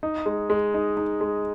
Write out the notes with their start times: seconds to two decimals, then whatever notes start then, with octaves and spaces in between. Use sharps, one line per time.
0.03 D#4
0.26 G#3
0.50 G#3
0.74 D#4
0.97 D#4
1.21 G#3